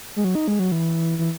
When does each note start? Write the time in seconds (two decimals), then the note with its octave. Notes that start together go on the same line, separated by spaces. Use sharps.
0.16 G#3
0.24 F#3
0.35 D#4
0.48 G#3
0.59 F#3
0.72 E3
1.19 E3